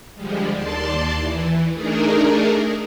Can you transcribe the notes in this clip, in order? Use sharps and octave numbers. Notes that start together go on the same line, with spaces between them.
D3 F3 G3 G#3
D#2 D5 A5 C6
E3
A3 D4 D#4 G#4 A#4